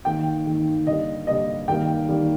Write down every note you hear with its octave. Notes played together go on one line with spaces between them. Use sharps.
D#3 A#3 G5
D#3 A#3
D3 G3 A#3 D#5
D3 G3 A#3 D#5
D#3 G3 A#3 G5
D#3 G3 A#3